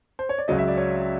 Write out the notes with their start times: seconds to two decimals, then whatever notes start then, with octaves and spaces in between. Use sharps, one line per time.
0.19 C5
0.29 C#5
0.38 D5
0.48 C#2 C#3 F#3 D#5
0.58 E5
0.68 D5
0.77 C#5